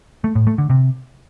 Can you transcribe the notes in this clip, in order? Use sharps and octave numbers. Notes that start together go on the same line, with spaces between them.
A3
A2
A3
D3
C3